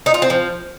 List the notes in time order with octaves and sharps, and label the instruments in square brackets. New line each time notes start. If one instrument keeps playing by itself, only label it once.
[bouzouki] D#4
F4
C4
F3